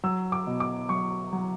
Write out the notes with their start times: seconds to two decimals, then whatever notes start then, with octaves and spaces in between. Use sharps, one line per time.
0.04 F#3 E6
0.32 D6
0.47 B2
0.60 D6
0.89 F#3 C#6
1.33 F#3